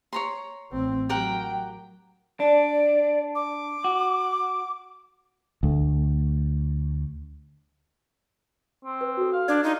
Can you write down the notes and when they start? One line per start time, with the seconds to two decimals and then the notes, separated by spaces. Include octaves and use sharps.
0.13 C#5 A#5 C6
0.71 A1 C4
1.09 F#3 G4 A#4 F#5 G5
2.40 D4 D5
3.35 D6
3.84 F#4
5.63 D2 A3
8.84 C4
9.01 B4
9.17 F#4 A4
9.32 F5
9.48 D4 D5
9.63 D#4 F4